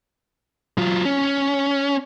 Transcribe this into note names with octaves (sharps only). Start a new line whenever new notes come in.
F#3 F4
C#4